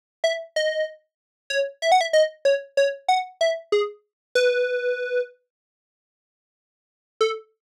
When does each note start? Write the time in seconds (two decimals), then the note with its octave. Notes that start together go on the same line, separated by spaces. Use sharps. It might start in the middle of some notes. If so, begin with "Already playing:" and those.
0.24 E5
0.56 D#5
1.50 C#5
1.82 E5
1.92 F#5
2.01 E5
2.13 D#5
2.45 C#5
2.77 C#5
3.08 F#5
3.41 E5
3.72 G#4
4.35 B4
7.21 A4